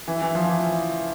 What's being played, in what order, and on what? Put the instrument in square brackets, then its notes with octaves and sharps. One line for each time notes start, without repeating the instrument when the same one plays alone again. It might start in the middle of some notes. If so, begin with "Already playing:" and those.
[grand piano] E3
E3
F3
E3